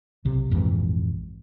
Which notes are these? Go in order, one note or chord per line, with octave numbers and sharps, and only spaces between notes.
B1 C3
A#1 F2 G#2 E3